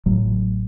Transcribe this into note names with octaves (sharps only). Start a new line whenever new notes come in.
A1 A2 F#3 A3